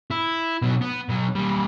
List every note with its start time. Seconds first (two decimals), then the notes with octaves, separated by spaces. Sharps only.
0.11 E4
0.62 B2 F#3
0.81 B3
1.09 B2 F#3
1.35 G3 A#3